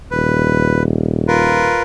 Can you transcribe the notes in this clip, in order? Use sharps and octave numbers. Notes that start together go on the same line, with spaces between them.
D#1 B4
F4 A#4 B4